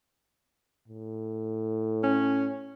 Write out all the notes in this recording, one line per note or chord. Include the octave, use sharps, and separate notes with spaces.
A2
C#4